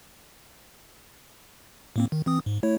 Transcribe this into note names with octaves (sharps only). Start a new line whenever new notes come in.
A2 A#3 C4
D#3
E3 C4 D#6
G#2
A3 E4 C#5